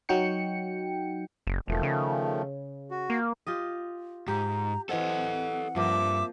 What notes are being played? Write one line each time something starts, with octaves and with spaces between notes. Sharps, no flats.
F#3 D#4 F#4 G5 C#7
F#1
E1 D#3 F3 A3
C#3
F#4
A#3
F4 G4 D#5
G#2 G4 A#5
E3 C4 A4 D#5 F#5
G2 F3 A#3 E5 D6